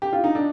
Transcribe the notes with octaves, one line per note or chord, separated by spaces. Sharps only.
G4
F4
D#4
D4